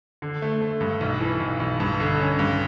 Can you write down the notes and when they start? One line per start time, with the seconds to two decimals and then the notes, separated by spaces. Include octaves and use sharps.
0.22 D3
0.42 A3
0.62 A3
0.81 G2
1.01 B1
1.20 E3
1.40 B1
1.60 B1
1.80 G2
2.00 D3
2.20 C#4
2.39 G2